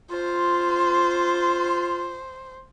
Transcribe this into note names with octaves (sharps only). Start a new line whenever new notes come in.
F4 C5